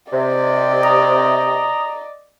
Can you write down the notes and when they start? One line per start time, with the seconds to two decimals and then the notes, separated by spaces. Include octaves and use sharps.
0.12 C3 D5 D#5
0.83 A#5 D#6